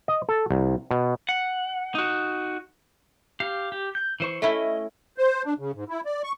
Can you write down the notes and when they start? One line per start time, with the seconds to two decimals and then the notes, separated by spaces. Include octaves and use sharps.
0.08 D#5
0.29 A4
0.50 C2
0.91 B2
1.29 F#5
1.95 D#4 F#4
3.40 G4 F5
3.72 G4
3.95 G6
4.20 E3 C5 C#6
4.42 A3 C#4 E4 D#5
5.18 C5
5.45 D4
5.58 C#3
5.74 G#2
5.89 E4
6.05 D5
6.23 C#6